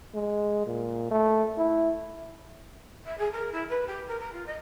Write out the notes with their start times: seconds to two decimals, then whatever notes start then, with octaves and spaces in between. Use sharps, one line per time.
0.14 G#3
0.66 A#2
1.11 A3
1.58 E4
3.05 E5
3.17 G#4
3.31 A#4
3.52 E4
3.69 B4
3.87 G4
4.08 A#4
4.19 A#5
4.32 F4
4.46 D#5